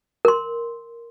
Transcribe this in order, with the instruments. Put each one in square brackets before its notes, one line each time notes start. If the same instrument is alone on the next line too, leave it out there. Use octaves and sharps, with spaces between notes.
[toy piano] A#4 C6